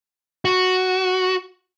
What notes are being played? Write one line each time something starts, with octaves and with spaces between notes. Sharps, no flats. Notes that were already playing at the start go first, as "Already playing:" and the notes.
F#4